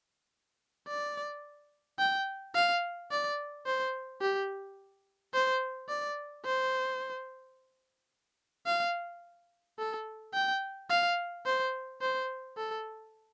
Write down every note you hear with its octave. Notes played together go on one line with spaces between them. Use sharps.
D5
G5
F5
D5
C5
G4
C5
D5
C5
F5
A4
G5
F5
C5
C5
A4